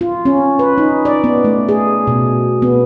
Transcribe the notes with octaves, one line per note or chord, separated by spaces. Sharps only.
F4
C#4
B4
D#4
D5
B3
A3
G#4
B2
B3